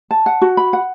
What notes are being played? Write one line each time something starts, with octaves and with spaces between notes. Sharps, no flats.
A5
F#5
F#4
B5
F#5